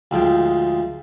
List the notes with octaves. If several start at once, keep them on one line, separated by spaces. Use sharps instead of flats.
D2 G#2 F3 G5